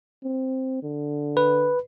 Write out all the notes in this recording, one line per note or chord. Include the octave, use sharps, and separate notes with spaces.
C4
D3
B4